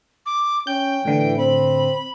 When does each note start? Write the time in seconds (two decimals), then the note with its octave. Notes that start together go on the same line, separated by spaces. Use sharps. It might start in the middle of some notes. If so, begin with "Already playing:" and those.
0.26 D6
0.67 C#4 G5 G6
1.05 A2 D3 E3
1.38 C4 B5